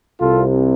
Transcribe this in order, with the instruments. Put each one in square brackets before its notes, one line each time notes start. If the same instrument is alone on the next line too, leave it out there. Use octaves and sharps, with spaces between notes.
[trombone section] C2 C3 F4 A4